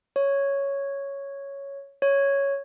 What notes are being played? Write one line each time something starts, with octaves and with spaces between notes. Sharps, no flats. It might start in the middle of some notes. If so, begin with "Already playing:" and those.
C#5
C#5